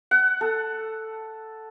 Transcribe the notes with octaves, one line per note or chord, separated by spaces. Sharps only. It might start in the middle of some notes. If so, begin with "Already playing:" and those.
F#5
A4